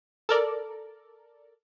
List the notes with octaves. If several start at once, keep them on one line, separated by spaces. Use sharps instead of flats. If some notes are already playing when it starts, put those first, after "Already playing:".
A4 A#4 D5